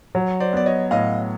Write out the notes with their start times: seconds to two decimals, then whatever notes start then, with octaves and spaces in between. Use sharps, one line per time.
0.15 F#3
0.40 C5 D5
0.53 B3 D5
0.66 C#5 D#5
0.91 A2 D#5 F5